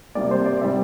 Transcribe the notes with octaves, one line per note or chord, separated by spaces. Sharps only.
C3 G3 A#3 D5
C5
D5
C3 G3 C4 E5